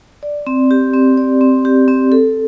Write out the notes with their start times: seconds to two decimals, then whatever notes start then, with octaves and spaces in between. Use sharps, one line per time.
0.23 D5
0.47 C4
0.71 G4
0.94 C4
1.18 D5
1.41 C4
1.65 G4
1.88 C4
2.12 A4